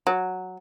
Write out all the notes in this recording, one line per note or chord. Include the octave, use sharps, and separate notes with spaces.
F#3